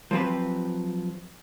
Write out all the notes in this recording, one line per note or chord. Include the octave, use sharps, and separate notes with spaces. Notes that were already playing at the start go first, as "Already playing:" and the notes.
F3 F#3 C4 G4 B4